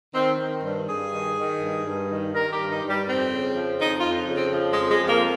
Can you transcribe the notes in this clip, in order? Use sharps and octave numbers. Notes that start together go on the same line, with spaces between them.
D#3 C4
D#3
G2
G2 G#4
D#3
D#3
G2
G2
D#3
D#3 A#4
G4
G2
D#4
G2
G3
F2 C4
C#3
F3
F2 D#4
F4
F2
C#3
C4
F3
G#3
F2
G#3
F2
A#3